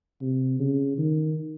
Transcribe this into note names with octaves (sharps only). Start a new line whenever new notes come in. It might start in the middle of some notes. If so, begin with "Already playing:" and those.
C3
C#3
D#3